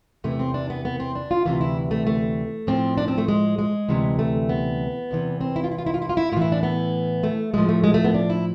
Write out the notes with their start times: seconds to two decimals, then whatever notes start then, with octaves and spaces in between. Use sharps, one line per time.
0.24 E2 C3 E3 A3
0.39 C4
0.54 D4
0.70 B3
0.85 B3
1.00 C4
1.15 D4
1.31 F4
1.46 D2 C3 E3 F4
1.61 E4
1.91 A3
2.07 A3
2.67 A2 F3 C4
2.98 D4
3.08 C4
3.18 A3
3.28 G#3
3.59 G#3
3.89 D2 C3 E3
4.19 A3
4.49 B3
5.11 E2 C3 E3
5.41 C4
5.56 E4
5.64 F4
5.71 E4
5.78 F4
5.86 E4
5.94 F4
6.02 E4
6.09 F4
6.17 E4
6.32 A2 F4
6.37 E3 E4
6.52 D4
6.63 B3
7.23 A3
7.54 A2 F3 G#3
7.69 A3
7.84 G#3
7.94 A3
8.04 B3
8.14 D4
8.30 E4